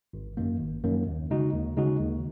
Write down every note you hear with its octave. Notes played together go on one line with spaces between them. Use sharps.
G#1
F#2 D#3 A#3
G#1
F#2 D#3 A#3
D#2
C#3 G#3 D#4 F#4
D#2
C#3 G#3 D#4 F#4
D#2